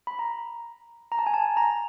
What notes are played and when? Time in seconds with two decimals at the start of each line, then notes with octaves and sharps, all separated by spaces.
0.07 B5
0.19 A#5
1.12 A#5
1.19 A5
1.26 G#5
1.34 A5
1.57 A#5